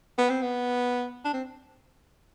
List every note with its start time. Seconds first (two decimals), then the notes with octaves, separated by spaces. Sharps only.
0.18 B3
0.30 C4
0.42 B3
1.25 D4
1.34 C4